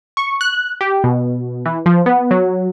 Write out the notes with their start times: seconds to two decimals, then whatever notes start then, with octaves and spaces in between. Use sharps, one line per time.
0.17 C#6
0.41 F#6
0.81 G4
1.04 B2
1.66 E3
1.86 F3
2.06 B3
2.31 F#3